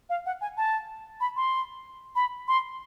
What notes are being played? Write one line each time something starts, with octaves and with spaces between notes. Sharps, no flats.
F5
F#5
G#5
A5
B5
C6
B5
C6